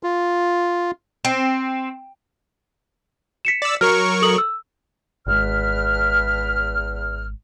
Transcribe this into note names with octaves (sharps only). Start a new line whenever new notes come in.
F4
C4
B6 C#7 E7
D5 E6
F#3 A#4 C#6 F6
A4 D#6 F#7
E6
G#1 E2 G#2 B4 F6